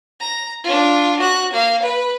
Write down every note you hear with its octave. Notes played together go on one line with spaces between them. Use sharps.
A#5
D4 F4
F#4 F#6
A#3 F5
B4